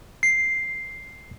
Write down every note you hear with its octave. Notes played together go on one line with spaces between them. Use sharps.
C7